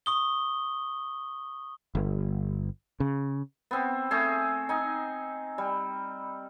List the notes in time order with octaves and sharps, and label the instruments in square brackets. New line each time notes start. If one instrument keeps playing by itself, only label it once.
[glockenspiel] C#6 D#6 G7
[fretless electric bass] G1
C#3
[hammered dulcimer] B3 C4
A3 C4 G#4
D#4 G#5
G3